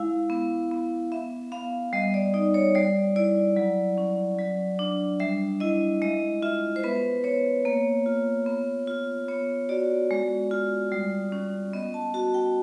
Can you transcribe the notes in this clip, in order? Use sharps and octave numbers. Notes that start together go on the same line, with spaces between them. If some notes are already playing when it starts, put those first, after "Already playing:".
Already playing: G#3 E4 F5
B3
B3
B3 E5
B3 F5
G3 D#5
D5
D#4 D5
C#5
G3 D5
E4 D5
F#3
C#4
F#3
D4
G3 E5
E4 D#5
G#3 D#5
F4 E5
C5
B3 B4
B3 C#5
A#3 C#5
F4
B3
F4
B3 C#5
F#4 D5
G#3
F4
G3
C#4
B3 D#5
A5
F#4 A5
G5